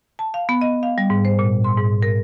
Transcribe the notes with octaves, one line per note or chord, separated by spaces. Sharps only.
A5
F5
B3
D#5
F5
G3
G#2
C5
A#2
C6
G#2
A#4